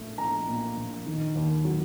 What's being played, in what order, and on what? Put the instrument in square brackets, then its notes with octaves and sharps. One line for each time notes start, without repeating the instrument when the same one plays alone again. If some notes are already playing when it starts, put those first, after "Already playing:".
Already playing: [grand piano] A#1 A#2 A3
A#1 A#5
A#2
A#1
D#3
D#2
F#3